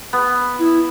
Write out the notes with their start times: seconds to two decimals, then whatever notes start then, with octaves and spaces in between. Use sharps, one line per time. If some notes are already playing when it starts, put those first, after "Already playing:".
0.13 B3
0.59 E4